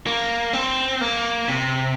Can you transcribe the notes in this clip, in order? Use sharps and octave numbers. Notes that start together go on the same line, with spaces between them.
A#3
C4
A#3
C3